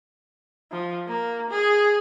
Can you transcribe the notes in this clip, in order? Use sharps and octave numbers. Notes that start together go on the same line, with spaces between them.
F3
A#3
G#4